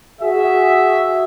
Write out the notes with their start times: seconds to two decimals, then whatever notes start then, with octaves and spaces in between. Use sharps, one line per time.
0.21 F#4 G#4 E5